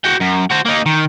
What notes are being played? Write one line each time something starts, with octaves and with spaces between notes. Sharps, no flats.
F#4 G5
F#2
F#4 C5
A#3 D#4
D#3